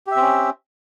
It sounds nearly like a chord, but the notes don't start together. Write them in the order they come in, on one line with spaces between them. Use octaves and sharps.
G4 E5 C4 C#4